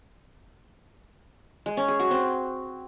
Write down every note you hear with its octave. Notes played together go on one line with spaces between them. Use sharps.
G#3
C#4
G#4
F#4
C4